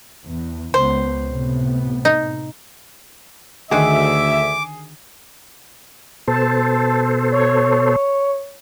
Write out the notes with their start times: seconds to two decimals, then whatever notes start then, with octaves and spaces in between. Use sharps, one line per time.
0.23 E2
0.74 C#2 B3 C5
1.27 A2 C3 B3
2.05 D#4
3.71 D2 D3 D#3 F#4 G#4 E5 D6
6.28 B2 A4 C5 A5
7.32 C#5